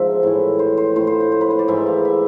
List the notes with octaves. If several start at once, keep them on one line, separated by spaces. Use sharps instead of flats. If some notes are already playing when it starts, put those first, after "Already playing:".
Already playing: G#2 F3 E5
A2 E3
C5
C5
A2 F3 C5
C5
C5
C5
B4
C5
D5
G#2 E3 E5
F5
E5